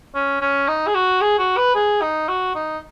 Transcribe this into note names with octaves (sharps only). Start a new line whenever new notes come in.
C#4
C#4
D#4
G#4
F#4
G#4
F#4
B4
G#4
D#4
F#4
D#4